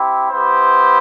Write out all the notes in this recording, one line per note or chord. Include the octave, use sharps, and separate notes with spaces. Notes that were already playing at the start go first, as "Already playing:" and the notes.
Already playing: C4 E4 G4
B3 E4 G4 C5